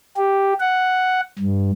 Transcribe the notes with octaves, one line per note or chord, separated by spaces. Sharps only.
G4
F#5
G2